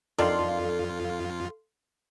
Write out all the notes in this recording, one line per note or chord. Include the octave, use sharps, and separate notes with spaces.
F2 D#3 D4 F4 A4 D5 F5 C6